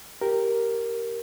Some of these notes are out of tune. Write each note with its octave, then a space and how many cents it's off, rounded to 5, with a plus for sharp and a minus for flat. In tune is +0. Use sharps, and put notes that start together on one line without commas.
G4 +0 A#4 +0